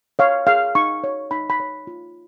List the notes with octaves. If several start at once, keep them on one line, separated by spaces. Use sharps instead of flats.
C#5 F5
G#4 F5
D#4 C#6
C#5
D#4 B5
B5
C#5
F4